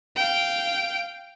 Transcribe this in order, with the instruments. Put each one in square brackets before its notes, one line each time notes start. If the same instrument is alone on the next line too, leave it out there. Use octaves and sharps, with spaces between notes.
[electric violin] F5 G5